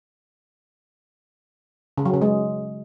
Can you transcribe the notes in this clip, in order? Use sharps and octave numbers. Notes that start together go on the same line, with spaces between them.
C#3
F#3
C#3
G#3